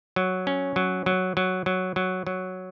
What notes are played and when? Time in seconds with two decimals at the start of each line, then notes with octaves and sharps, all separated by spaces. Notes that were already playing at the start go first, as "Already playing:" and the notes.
0.16 F#3
0.47 C#4
0.76 F#3
1.06 F#3
1.37 F#3
1.66 F#3
1.96 F#3
2.27 F#3